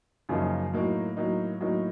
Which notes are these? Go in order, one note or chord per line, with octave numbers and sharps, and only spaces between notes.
F#2 C#3 F3 A#3 D#4
A2 F#3 A#3 D#4
A2 F#3 A#3 D#4
A2 F#3 A#3 D#4